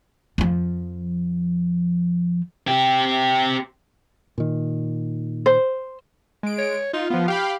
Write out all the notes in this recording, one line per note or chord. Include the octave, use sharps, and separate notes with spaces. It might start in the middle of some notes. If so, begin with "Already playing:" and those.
F2 F3
C4 G4
A#2 D#3
C5
G#3 D7
C#5
D#4 F4
F3 B3 F4
G4 F5 G5 B5